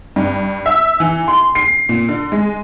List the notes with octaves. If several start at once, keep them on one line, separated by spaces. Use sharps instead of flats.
G2
E5
E3
C6
C7
A#2
D3
G#3